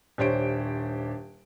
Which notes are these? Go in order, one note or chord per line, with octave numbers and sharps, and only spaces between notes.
D#1 D4 G4 C5 C#5 D7